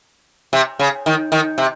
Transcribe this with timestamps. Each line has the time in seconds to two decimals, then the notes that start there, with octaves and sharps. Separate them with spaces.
0.53 C3
0.79 C#3
1.06 D#3
1.32 D#3
1.58 C3